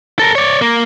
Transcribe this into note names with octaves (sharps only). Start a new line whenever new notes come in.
A4 A#4
C#5 D5
A#3